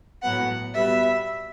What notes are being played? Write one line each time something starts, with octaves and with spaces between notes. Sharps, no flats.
A2 F#3 B3 F#5
B2 G3 B3 E5